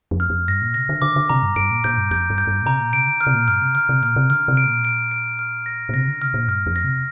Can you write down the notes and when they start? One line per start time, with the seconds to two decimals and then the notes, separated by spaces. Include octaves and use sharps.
0.11 F2
0.20 F6
0.30 F2
0.48 G2 A#6
0.62 A#2
0.74 C3 A#6
0.89 D3
1.02 D3 D6
1.16 D3
1.30 C3 A#5
1.43 G2
1.56 G2 D7
1.71 A#2
1.84 A#2 G6
1.97 G2
2.11 F2 G6
2.30 G2
2.38 G6
2.47 G2
2.62 A#2
2.66 C3 A#5
2.79 A#2
2.93 C3 D7
3.07 D3
3.21 F6
3.27 C3
3.34 A#2
3.48 G2 F6
3.62 C3
3.75 D3 F6
3.89 C3
4.02 A#2 F6
4.16 C3
4.30 D3 F6
4.48 C3
4.57 D7
4.66 A#2
4.85 D7
5.11 D7
5.39 F6
5.66 A#6
5.89 A#2
5.94 C3 A#6
6.08 D3
6.22 C3 F6
6.34 A#2
6.48 G2 F6
6.66 F2
6.76 A#6
6.84 C3